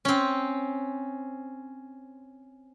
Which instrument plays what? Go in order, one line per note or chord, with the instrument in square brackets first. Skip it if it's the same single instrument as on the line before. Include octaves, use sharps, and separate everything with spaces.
[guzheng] C4 C#4